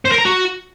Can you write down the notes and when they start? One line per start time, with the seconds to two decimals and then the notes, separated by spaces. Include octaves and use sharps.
0.05 C5
0.12 A#4
0.19 A#5
0.25 F#4